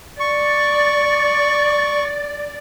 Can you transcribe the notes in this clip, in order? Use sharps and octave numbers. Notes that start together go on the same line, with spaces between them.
D5 C#6